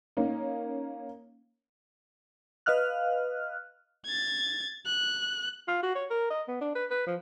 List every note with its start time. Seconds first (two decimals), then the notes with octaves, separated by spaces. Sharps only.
0.17 A#3 C#4 D#4
2.66 B4 D#5 F5 F6 F#6
4.05 G#6 A6
4.86 F#6
5.68 F4
5.83 F#4
5.95 C#5
6.10 A#4
6.30 D#5
6.48 B3
6.61 D4
6.75 B4
6.90 B4
7.06 F3